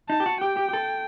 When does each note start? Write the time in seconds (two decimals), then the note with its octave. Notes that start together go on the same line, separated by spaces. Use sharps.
0.09 D#4 A5
0.20 G4
0.26 F#4
0.41 G4 G5
0.57 G4
0.69 G4
0.73 A4